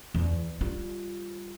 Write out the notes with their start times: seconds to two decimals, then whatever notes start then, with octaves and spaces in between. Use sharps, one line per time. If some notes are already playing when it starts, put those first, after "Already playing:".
0.15 E2
0.61 G3 F4